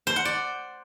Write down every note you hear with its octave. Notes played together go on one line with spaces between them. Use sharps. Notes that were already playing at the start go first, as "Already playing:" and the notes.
C5
F#5
D5